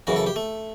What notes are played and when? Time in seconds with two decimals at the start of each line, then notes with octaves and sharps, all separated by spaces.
0.07 F#2 C#3 E3 F#4
0.16 A4
0.27 G4
0.36 A3